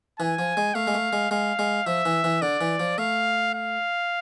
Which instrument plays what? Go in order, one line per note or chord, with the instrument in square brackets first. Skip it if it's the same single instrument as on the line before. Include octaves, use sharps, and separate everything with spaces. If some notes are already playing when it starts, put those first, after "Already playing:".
[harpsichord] E3 [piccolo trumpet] G#5
[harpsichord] F3
G#3
[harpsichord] A3 [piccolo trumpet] F5
[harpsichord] G#3
A3
G#3
[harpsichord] G#3 [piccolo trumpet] F5
[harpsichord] G#3
[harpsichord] F3 [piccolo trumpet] E5
[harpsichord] E3
E3
[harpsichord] D3 [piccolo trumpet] D5
[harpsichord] E3
F3
[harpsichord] A3 [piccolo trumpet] F5
[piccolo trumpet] F5